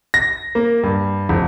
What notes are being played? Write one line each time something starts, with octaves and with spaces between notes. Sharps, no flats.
A#6
A#3
G2
F1